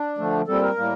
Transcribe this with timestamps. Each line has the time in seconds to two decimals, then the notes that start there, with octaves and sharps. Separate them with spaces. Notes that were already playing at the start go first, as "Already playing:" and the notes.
Already playing: D4
0.18 D3 F3 A3
0.47 A#2 G3 C4 A4
0.63 A#4
0.76 A2 G3 A#3